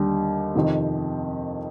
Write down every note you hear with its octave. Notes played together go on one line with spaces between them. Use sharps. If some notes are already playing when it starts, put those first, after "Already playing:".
Already playing: D#2 D3 G3
F2 C3 D#3